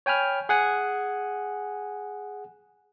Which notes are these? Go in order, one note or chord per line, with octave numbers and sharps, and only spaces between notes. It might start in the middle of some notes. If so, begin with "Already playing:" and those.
C#5 G5 G#5 B5 F6
G#4 F#5 G#5